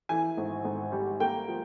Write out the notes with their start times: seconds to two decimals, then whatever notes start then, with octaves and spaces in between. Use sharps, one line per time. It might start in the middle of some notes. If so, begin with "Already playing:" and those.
0.09 E3 G#5
0.37 G#1
0.65 G#1
0.92 G3
1.20 A#3 G5
1.48 F3